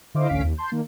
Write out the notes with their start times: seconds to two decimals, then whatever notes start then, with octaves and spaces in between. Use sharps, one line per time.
0.15 D3 E4 C5 D#5 F5 D6
0.29 A1 D2 C#4 F5 B6 D7
0.43 D#2
0.57 A5 C6 G6
0.72 D#3 A#3